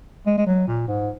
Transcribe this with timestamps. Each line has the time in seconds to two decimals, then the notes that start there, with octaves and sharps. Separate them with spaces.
0.26 G#3
0.38 G#3
0.47 F#3
0.68 A#2
0.88 G#2